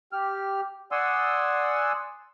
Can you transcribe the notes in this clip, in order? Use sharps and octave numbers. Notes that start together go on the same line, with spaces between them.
G4 F6
D5 F#5 G#5 C6 D#6 E6